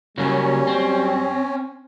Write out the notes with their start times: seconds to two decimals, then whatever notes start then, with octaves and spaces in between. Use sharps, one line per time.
0.18 F#2 C#3 F#3 G3 A#3 C#4
0.67 C4